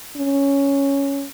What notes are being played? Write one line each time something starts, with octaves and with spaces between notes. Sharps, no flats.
C#4